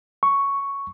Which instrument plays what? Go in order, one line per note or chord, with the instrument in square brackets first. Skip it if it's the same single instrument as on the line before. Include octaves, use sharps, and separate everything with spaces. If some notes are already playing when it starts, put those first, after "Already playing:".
[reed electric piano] C#6